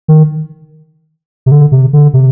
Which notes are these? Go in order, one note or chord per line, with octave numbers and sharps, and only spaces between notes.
D#3
C3
D3
C3
D3
C3